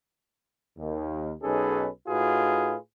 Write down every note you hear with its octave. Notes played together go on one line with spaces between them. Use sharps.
D#2
B1 C#4 D#4 G#4 A4 B4
A2 D#4 F4 F#4 G#4 B4